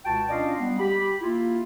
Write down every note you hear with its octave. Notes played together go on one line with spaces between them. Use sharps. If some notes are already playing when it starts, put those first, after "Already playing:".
C#2 B2 F#4 G5 A5
C#4 D4 F4 D5 D#5 F5
G3 B3
G4 B5
A#3 E4 F4